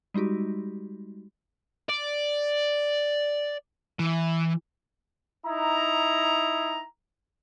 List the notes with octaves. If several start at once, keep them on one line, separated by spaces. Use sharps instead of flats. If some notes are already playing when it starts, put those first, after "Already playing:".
G3 G#3 D#4 F#4 G4
D5
E3
D#4 E4 A#5